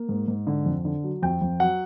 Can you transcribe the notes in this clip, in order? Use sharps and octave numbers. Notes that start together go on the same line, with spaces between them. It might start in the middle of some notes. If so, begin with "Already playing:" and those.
Already playing: A#3
G#2
G#2
D3
F2
D3
F#3
F2 G5
F2
F#3 F#5